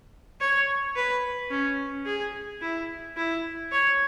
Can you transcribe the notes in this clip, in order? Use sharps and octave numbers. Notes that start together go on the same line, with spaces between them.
C#5
B4
C#4
G#4
E4
E4
C#5